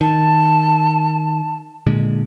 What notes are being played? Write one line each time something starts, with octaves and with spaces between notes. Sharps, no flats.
D#3 A5
A#2 D3 G#3